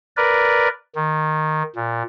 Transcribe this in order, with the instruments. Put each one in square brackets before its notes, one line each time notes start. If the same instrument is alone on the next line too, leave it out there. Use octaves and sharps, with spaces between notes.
[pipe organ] A#4 B4 D5
D#3
A#2